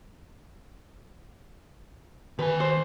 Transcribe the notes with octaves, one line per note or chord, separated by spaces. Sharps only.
D#3 B4 G#5
C5